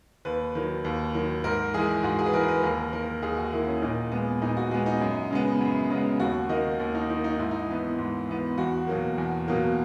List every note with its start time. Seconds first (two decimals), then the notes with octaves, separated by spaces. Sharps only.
0.25 D#2 B4
0.55 D#3 F#3
0.84 D#2
1.14 D#3 F#3
1.44 G#2 A#4
1.74 E3 G#3 G#4
2.03 G#2 F#4
2.19 G#4
2.26 B4
2.33 E3 G#3 A#4
2.48 B4
2.63 D#2 A#4
2.93 D#3 A#3 A#4
3.22 D#2 G#4
3.37 F#4
3.52 D#3 A#3 E4
3.67 C#4
3.82 A#2 D#4
4.12 G#3 B3
4.42 A#2 D#4
4.57 F#4
4.71 G#3 B3
4.86 D#4
5.01 F#2
5.31 C#3 G#3 B3
5.61 F#2
5.90 C#3 G#3 B3
6.20 D#2 F#4
6.49 D#3 A#3 D#5
6.80 D#2
6.95 D#4
7.10 D#3 A#3 D#4
7.24 D#4
7.39 G#2 E4
7.51 D#4
7.62 E4
7.69 E3 B3
7.99 G#2
8.29 E3 B3
8.58 E2 F#4
8.87 B2 F#3 A#3
9.18 E2
9.48 B2 F#3 A#3